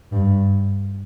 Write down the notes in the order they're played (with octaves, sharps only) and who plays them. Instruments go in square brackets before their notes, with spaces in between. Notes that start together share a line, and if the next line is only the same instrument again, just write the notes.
[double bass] G2